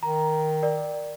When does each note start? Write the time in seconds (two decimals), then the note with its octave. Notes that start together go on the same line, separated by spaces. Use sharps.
0.03 D#3 A#5
0.63 A#4 D5